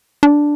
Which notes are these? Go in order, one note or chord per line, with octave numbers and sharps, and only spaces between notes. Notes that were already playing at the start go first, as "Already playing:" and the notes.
D4